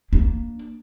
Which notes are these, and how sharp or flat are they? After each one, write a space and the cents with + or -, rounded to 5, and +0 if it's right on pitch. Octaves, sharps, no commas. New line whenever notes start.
A#3 +0 D4 -10